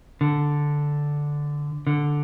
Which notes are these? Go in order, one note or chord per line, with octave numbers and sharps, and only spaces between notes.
D3
D3